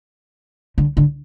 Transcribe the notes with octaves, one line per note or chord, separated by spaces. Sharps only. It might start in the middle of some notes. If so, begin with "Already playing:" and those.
D3
D3